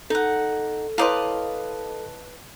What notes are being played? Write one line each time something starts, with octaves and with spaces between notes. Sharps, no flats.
D#4 A4 F#5
E4 B4 C#5 D#5 F5 A5 C6 D6